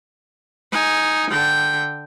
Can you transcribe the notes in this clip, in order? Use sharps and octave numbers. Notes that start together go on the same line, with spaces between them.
D#4 G#5
D3 G5